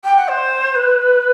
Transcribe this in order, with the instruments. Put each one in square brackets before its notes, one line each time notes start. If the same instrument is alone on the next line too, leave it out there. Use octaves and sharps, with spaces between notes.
[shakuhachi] G5
F#5
C5
B4